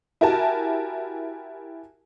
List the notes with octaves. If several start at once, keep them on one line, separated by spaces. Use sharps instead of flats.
E4 F#4 G4 A#4 G#5 A5